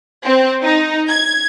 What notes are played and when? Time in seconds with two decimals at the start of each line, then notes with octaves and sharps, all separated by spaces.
0.23 C4
0.61 D#4
1.08 G#6